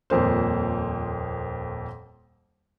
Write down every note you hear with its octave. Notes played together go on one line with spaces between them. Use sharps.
D#1 F2 A#3 C5